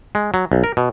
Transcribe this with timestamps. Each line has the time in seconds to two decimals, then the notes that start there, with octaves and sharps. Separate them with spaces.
0.15 G#3
0.34 F#3
0.52 B1
0.64 A#4
0.77 B2